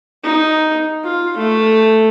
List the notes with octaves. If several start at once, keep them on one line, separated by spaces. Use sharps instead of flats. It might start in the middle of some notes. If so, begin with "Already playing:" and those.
D#4
F4
A3